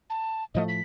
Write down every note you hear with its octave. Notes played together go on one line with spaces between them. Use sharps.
A5
A2 F3 A3 D#5
B6